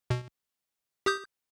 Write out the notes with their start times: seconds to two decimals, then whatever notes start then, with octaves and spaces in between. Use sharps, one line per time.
0.10 B2
1.06 G4 D#6 G6